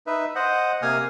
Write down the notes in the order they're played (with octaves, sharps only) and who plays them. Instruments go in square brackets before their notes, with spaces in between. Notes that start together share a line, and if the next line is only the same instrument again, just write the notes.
[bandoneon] D#4 B4 E5
C5 D#5 F#5
C3 A#3 F5 G#5 D#6 F6